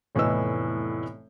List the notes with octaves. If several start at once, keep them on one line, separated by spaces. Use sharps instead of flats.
F1 A2 E3 B3 D#5 E6